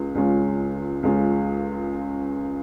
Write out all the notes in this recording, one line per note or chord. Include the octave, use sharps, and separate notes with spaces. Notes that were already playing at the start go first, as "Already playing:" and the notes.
Already playing: C#2 G#3 C#4 F4
C#2 C#3 G#3 C#4 F4
C#2 C#3 G#3 C#4 F4